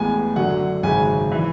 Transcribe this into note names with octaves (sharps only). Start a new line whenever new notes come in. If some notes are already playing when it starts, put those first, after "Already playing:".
Already playing: A1 A2 G#3 B3 G#5
F#2 D3 F#3 F#5
G#1 F#2 C#3 G#5
E3